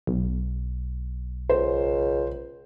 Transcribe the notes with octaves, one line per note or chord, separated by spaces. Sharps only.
B1
C#2 C5